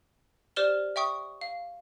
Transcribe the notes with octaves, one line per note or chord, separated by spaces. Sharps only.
G4 C5 D5 F6 E7 G7
E5 G5 C#6 D#6
F5